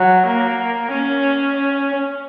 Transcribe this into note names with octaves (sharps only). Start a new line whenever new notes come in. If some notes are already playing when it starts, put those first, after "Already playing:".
Already playing: F#3
A#3
C#4